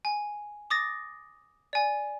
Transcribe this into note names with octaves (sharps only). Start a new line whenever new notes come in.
G#5
D6 D#6 A6 A#6
D5 G#5